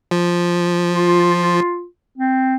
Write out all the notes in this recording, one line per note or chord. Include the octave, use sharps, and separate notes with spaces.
F3
F4
C4